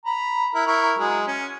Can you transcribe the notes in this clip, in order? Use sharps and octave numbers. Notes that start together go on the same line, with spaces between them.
A#5 B5
E4 A#4
E4 A#4 C#6
F#3 G#3
C#4